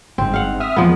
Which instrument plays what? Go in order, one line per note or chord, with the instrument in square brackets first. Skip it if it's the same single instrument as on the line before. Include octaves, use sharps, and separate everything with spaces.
[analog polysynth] G1 G#2 [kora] C4
[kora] F5 F#5
[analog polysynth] E5 D#6 F6
[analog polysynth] E2 G#3 A#3 [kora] F3 B3